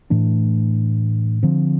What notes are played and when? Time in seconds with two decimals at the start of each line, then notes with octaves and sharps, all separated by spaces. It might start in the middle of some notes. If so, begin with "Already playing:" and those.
0.10 A2 E3 A3 D4
1.43 D3 F3 C4